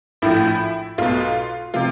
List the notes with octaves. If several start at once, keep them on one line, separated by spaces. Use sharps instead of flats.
A#1 A2 F3 E4
B1 B2 F4
C3 F3 F4